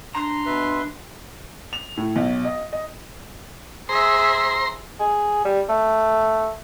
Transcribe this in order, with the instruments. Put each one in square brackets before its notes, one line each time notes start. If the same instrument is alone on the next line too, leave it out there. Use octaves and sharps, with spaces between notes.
[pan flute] D4 [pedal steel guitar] A#5 [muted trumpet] C6
[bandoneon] B2 B4 E5
[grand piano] F7
A2
B1
D#5
D#5
[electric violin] G#4 E5 [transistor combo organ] C5 A#5 C6
[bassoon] G#4
G3
A3